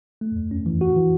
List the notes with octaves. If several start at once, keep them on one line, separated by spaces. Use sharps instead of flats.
A3
E2
C#4
E3
F#4
E3